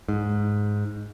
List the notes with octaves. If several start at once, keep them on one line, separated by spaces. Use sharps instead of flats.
G#2